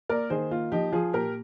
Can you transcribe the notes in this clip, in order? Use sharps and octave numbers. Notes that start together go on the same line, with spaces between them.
A#3 A#4 D5
D#3 G#4 C5
A#3 F4
F3 D#4 G4
F3 F4 G#4
A#2 G4 A#4